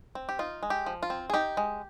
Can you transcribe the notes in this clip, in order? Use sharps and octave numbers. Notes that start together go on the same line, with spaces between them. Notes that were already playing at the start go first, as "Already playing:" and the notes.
C4
G4
D#4 F4
G#3
G4
F3
F4
C4
G#4
D#4 G4
G#3